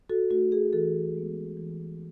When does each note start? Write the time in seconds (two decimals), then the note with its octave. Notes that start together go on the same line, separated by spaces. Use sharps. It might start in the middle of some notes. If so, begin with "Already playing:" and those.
0.09 F#4 A4
0.30 A3 D#4 F#4
0.52 G#4
0.73 E3 F#4 A4
1.14 G#3 B3
1.57 E3